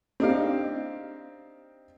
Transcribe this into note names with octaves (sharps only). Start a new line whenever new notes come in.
C4 D4 D#4 G4 F5